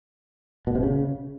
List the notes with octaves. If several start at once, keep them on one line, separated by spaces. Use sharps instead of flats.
B2
C3
C#3